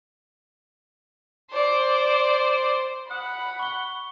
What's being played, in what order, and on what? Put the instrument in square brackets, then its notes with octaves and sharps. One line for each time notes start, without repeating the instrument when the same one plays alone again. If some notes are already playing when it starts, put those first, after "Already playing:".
[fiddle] C5 [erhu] D5
[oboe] F#5 [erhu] B5 [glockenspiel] D#6
[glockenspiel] C#6 G7